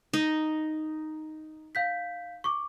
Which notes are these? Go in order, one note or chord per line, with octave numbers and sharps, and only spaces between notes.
D#4
F5 G6 B6
C#6 D6